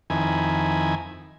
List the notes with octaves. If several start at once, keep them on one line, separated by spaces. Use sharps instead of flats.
F2 D#3 E4 G#5